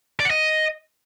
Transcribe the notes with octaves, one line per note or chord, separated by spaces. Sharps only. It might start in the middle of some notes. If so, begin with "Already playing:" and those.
D5
F#5
D#5